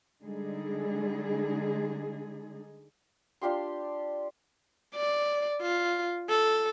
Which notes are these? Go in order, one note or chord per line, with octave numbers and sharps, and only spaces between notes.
D3 G3 G#3 D#4 G#4
D4 F4 G4 C6
D5
F4
A4